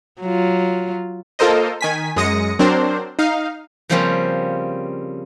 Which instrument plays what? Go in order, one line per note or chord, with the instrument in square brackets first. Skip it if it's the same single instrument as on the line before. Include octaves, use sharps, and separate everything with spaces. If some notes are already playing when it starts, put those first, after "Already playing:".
[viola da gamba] F#3 F4
[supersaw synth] A#3 F4 A4 A#4 C5 D#5
D#3 G#5 B6
F#2 G#3 D#6 A#6 C#7
F#3 C4 D4 A#4 C5
D#4 F5
[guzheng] C#3 F3 G3 A#3 C4 C#4